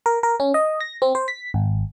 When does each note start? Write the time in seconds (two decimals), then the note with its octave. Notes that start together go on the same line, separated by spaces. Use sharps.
0.06 A#4
0.23 A#4
0.40 C#4
0.54 D#5
0.81 A#6
1.02 C4
1.15 C5
1.28 B6
1.54 G#1